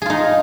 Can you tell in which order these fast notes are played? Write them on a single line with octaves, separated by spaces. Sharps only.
G#4 F4 D#4